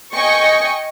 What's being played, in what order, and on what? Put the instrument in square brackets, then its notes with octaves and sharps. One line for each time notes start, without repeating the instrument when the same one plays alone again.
[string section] D#5 G5 G#5 C#6